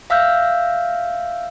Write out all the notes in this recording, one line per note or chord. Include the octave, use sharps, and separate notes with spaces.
E5 F5 E6 F6 G6